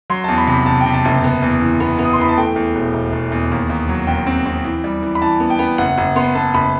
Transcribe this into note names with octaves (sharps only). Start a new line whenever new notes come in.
F#3 C6
E2 A5
B5
C3
B5
C3 A5
C3 G5
A5
F#1
B3
E2
E3
B3
B3
D#6
C6
E3 B5
A5
A3 G5
E2
E1
E1
E1
E2
D#2
D#2
F#3
D#2 G5
C4
C4
E3
G3
E3
B5
E3 A5
B3
G5
B3
F#1 F#5
F#1
B3 C6
B3 A5
F#1 B5